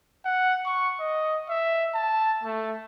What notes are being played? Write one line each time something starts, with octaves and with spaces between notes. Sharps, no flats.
F#5
C#6
D#5
E5
A5
A3